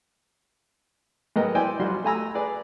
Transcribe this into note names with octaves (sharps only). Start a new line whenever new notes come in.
G#2 F#3 B3 A#4 D#5 G5
E4 C5 D5 E5 G5 G#5
G3 D#4 F4 F#4 C6
A3 G#5 A#5 E6
G#4 B4 D5